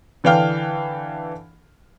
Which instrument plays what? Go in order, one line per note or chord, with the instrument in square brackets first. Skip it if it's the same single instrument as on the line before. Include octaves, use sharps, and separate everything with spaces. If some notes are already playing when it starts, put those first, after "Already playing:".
[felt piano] D3 E3 D4 F5 G5 F6